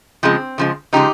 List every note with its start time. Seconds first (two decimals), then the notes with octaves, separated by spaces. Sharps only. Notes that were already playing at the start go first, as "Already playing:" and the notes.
0.23 C#3 F3 G#3 C4
0.58 C#3 F3 G#3
0.93 C#3 F3 G#3 D#4 G4